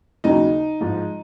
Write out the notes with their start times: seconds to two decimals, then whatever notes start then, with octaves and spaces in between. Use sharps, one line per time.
0.24 D#2 C#3 F#3 D#4
0.81 G#2 F3